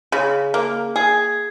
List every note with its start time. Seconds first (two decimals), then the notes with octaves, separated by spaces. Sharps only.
0.12 C#3
0.54 A#3
0.96 G#4